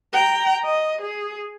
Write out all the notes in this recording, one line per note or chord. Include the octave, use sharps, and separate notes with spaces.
G5 A#5
D#5
G#4